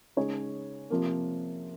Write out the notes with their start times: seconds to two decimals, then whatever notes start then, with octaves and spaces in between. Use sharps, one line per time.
0.17 C#3 G#3 D#4 G#4 C#5
0.90 C3 F3 A#3